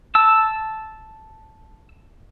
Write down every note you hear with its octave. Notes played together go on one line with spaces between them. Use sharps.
A5 E6